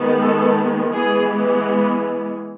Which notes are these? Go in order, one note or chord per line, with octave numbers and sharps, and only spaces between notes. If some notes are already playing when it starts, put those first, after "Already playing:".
Already playing: D#3 G#3 B3
A4
E3 G#3 B3 G#4